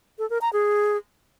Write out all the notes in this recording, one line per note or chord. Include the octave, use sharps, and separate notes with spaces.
A4
A#4
A#5
G#4